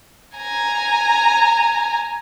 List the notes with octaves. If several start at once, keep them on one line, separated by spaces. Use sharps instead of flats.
G#5 A#5